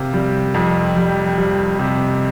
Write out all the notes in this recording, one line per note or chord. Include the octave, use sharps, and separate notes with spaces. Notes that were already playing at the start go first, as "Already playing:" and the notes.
Already playing: C3 A#3
G3
F2
G3
G3
C3